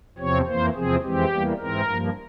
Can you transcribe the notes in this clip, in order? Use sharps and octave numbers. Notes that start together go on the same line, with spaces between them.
E2 C3 F3 C4 C#5
F2 E3 A#3 C5
E2 C3 F3 C4 G#4
F2 E3 G#3 C4 G4
E2 E3 G3 A#3
G#2 E3 G#3 C4 A#4
G2 F3 A#3